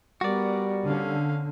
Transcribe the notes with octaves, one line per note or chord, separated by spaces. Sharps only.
G3 B3 F#4 A#4 D5
D3 C#4 F5